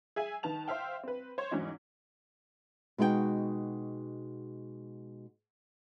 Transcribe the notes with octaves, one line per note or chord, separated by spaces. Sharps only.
G#4 E5 G#5
D#3 B4 A5 F7
C5 E5 F5 G5
C4 B4
C5 C#5
E2 G#2 E3 F#3 C#4 D#4
B2 G#3 D#4 F#4 G5